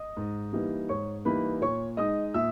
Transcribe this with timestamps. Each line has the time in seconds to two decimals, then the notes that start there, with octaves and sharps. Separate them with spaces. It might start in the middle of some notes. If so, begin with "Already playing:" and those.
Already playing: D#5 D#6
0.17 G#2
0.53 E3 G3 A#3 D#4
0.89 G#2 C#5 C#6
1.25 E3 G3 A#3 D#4 B4 B5
1.61 A#2 C#5 C#6
1.97 G#3 D#4 D#5 D#6
2.34 A#2 E5 E6